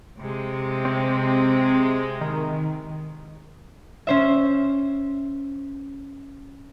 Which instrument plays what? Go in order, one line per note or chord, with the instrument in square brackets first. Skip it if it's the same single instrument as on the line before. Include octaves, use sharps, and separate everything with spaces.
[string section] C3 G#3
[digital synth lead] C4
D#3
[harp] C#4 C5 E5